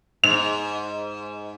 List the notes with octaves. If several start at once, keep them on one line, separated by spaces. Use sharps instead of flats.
G#2 F7